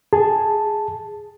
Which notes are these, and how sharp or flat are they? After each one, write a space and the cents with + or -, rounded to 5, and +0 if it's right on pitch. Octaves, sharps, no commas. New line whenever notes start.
G#4 +0 A5 +0